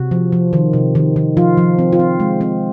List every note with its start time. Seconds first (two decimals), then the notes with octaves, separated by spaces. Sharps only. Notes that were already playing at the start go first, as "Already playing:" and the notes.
Already playing: C3 F#4
0.11 F3
0.32 F3
0.53 D#3
0.73 C3
0.95 D#3
1.16 D#3
1.37 F3 F4
1.57 F3
1.79 C4
1.93 F4
1.99 C4
2.20 G#3
2.41 C4